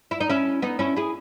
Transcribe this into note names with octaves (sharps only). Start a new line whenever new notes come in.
E4
D#4
C#4 E4
B3 D#4
C#4 E4
E4 G#4